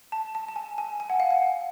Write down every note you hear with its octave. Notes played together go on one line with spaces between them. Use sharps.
A5
A5
A5
G#5
G#5
G#5
F#5
F5
F#5